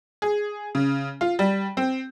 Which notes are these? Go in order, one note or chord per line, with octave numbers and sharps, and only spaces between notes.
G#4
C#3
F4
G3
C4